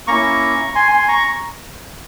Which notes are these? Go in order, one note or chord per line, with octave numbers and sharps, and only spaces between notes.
A#3 C#4 E4 A#5 C#6
G#5 C6
G#5 C6
A#5 C#6